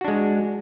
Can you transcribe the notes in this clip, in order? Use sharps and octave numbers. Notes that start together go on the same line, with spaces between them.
G#3 D4 F#4